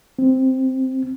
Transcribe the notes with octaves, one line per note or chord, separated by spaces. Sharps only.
C4